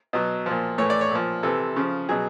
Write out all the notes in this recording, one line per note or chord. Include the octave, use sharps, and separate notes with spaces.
B2 F#3
A#2 F3
A2 E3 C#5
D5
C#5
A#2 F3
C3 E3 A4
C#3 F3
B2 F#3 G#4